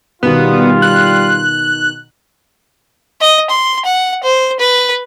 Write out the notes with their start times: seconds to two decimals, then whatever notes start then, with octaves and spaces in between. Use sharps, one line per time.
0.23 B2 D#3 G3 B3 F4
0.82 F#6
3.21 D#5
3.50 C6
3.85 F#5
4.24 C5
4.60 B4